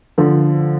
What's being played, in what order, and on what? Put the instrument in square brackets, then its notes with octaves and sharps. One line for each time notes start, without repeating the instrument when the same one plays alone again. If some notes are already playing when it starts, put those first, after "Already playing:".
[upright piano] D3 F3